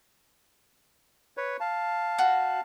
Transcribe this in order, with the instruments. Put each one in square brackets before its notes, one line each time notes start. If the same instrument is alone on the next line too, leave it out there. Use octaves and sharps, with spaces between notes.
[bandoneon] B4 C#5
F5 A5
[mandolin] F#4